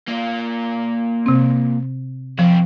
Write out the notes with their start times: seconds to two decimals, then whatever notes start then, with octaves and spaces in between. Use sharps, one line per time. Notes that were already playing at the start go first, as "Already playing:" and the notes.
0.08 A#3 F4
1.26 C3 C4
2.39 F3 C4 F#4